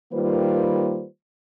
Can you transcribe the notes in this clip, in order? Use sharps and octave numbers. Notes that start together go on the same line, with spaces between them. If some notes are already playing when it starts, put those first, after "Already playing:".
D#3 G3 A#3 F4 B4 C5